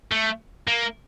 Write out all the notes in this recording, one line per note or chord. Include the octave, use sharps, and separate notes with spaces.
A3
A#3